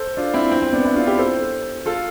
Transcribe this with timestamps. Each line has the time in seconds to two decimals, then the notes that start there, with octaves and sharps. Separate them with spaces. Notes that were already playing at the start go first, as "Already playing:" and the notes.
Already playing: A4 C5
0.17 D4 F4
0.34 C4 E4
0.51 C4
0.62 C4
0.73 B3 D4
0.85 C4 E4
0.96 D4 F4
1.07 E4 G4
1.18 A4 C5
1.86 F4 A4